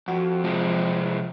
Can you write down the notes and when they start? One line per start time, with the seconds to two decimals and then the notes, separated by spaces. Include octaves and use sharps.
0.08 F2 F#4
0.44 C3 F3 G#3 C4